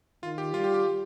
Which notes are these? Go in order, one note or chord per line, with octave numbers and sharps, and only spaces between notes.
D#3 F4
G4
G3 F4
G4
G4